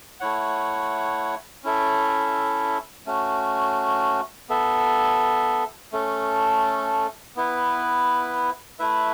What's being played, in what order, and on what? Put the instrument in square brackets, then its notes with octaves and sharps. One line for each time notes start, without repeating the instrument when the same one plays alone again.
[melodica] A3 E4 C#5 F#5
C#4 E4 A4 E5
A3 C#4 F#4
B3 A4 E5
A3 C#4 A4
B3 E4 B4
A3 E4 B4 E5